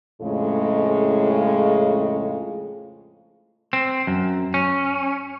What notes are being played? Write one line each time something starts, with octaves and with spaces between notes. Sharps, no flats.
F2 A2 C#3 G#3
C4
F#2
C#4